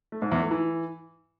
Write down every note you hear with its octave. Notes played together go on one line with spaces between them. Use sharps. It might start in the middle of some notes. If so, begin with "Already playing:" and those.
A3
G#2
E2
A3
E3